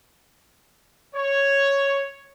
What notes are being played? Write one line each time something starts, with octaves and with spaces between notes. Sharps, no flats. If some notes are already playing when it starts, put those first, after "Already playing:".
C#5